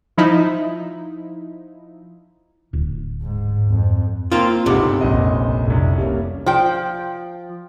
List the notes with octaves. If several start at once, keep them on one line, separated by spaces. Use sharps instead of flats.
F3 D#4 E4
D1
G#2
F2
A#3 C4 F4
G1 C#2 G#2 C3 F#5
F1 A#1 D#5
F1 C2
G3 A#3 C#4
F3 G5